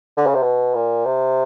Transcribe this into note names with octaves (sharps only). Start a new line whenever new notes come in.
D3
C#3
C3
B2
A#2
C3